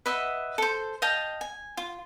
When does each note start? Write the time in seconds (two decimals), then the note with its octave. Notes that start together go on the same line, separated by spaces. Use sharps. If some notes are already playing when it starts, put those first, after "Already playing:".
0.06 B4 D#5 E5 F#5
0.58 A4 C5
1.02 D#5 F5 G5 A5
1.41 G#5
1.77 F4